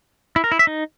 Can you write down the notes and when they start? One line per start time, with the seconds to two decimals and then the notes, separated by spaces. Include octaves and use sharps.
0.36 E4
0.44 A#4
0.52 E4
0.59 E5
0.67 D#4